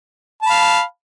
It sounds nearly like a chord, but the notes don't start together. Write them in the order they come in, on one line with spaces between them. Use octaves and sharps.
A5 B5 F5